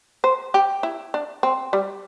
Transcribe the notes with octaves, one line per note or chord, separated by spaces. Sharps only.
C5
G4
E4
D4
C4
G3